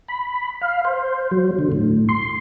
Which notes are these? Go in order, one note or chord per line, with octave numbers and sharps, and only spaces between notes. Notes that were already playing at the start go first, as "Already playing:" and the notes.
B5
F5
C5
F#3
D3
A2
C6